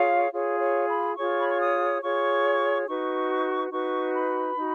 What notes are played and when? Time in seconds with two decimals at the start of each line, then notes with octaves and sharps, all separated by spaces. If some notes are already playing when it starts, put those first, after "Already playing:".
Already playing: F4 G#4 C#5 F5
0.31 F4 G#4 C#5
0.60 C#5
0.89 B5
1.16 F4 G#4 C#5 C#6
1.39 B5
1.48 C#6
1.59 D#6
2.02 F4 G#4 C#5 C#6
2.87 D#4 F#4 B4 C#6
3.71 D#4 F#4 B4 C#6
4.14 B5
4.56 D#4 F#4